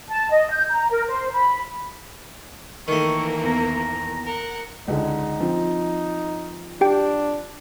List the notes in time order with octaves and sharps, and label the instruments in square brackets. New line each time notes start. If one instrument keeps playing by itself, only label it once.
[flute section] A5
D#5
G6
A#5
A#4
C5
B5
[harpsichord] D#3 A3 [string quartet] E3 A#3 A#4 [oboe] C#6
[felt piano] E2 [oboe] A#5
[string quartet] A#4 F#5
[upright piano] C#2 D3 G#3 [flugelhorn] D#4
[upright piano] F3 C4
[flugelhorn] D4 [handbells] G4 G5